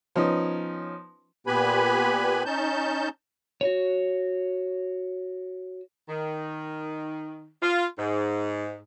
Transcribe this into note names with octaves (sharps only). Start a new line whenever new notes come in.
F3 B3 C#4 D#4
A#2 B3 G4 B4 G#5 B5
C#4 D#4 A5 G6
F#4 C#5
D#3
F4
G#2